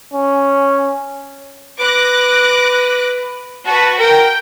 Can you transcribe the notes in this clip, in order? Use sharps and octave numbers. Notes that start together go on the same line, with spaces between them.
C#4
B4 D6 F#6 A#6
F#4 B4 A5
A#4 G5